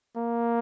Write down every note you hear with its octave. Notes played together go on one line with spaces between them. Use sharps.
A#3